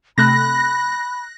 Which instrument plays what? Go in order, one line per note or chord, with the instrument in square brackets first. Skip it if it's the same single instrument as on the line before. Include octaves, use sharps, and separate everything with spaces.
[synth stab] C3 A3 [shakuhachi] B5 [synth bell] F#6 A#6